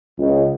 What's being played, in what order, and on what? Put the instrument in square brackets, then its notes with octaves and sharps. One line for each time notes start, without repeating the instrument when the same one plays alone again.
[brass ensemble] C#2